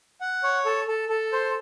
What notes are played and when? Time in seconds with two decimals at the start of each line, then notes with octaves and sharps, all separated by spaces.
0.21 F#5
0.43 C#5
0.65 A4
0.88 A4
1.09 A4
1.32 C5